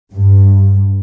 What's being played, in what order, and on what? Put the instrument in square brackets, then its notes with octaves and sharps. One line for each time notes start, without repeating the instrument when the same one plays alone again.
[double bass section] G2